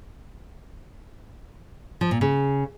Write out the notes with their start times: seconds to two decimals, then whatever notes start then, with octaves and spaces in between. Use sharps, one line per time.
2.01 F3
2.11 A#2
2.21 C#3